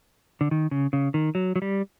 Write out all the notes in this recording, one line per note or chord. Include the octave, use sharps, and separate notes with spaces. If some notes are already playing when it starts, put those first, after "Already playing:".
D3
D#3
C#3
C#3
D#3
F#3
F#3
G3